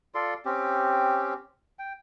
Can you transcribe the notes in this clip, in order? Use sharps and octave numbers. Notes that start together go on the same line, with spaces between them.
F4 A4 D5 C6
C4 C#4 G4
G5